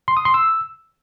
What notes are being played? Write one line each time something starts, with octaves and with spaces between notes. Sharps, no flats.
C6
D#6
C6
E6